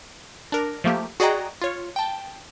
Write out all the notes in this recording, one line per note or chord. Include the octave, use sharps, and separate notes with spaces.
D4 A#4
F3 A3 A#3 G4
F#4 G#4 D5 D#5 G5 A#5
F4 C#5
G5 A5